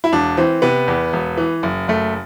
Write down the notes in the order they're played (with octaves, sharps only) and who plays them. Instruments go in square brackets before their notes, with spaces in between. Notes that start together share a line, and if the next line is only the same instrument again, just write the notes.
[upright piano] E4
E1 D4
E3 C4
C3 B3
E2
E1
E3
F#1
F#1 A3